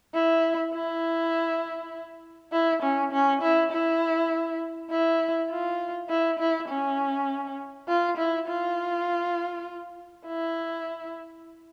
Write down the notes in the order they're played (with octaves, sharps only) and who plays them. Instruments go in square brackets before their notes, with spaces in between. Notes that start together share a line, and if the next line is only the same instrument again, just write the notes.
[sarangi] E4
E4
E4
C#4
C#4
E4
E4
E4
F4
E4
E4
C#4
F4
E4
F4
E4